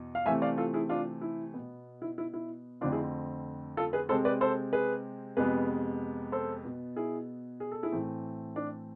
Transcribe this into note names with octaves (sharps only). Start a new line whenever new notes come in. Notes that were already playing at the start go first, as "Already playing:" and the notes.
Already playing: E2 B2
F5
C3 E3 A3 C4 E5 G#5
D5 F5
F4 A4
E4 G#4
D4 F4
E4
B2 B3
E4
E4
E4
F2 D3 A3 C4 D4 F4
E4 G#4
F4 A4
G#4 B4
C3 G#3 C4 A4 C5
B4 D5
A4 C5
G#4 B4
F2 C3 G#3 B3 G#4 B4
A4 C5
B2 B3
E4 G#4
G#4
A4
E4 G#4
A2 E3 A3 C4
D4